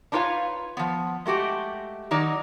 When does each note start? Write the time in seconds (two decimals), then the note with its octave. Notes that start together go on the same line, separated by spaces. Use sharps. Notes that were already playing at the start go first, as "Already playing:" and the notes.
0.12 D4 D#4 F4 B4 C#5 F5
0.77 F3 B3
1.26 G#3 A3 F#4 G4
2.11 D#3 F#3 D#4 D5